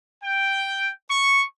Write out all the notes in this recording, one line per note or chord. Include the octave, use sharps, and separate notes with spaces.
G5
C#6